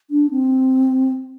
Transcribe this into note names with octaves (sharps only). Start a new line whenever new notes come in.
D4
C4